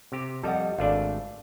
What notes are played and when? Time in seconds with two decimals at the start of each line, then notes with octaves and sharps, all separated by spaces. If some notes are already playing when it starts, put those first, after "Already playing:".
0.12 C3 G4
0.43 F2 G3 A4 D#5 F#5
0.78 G#1 A3 D4 D5 F5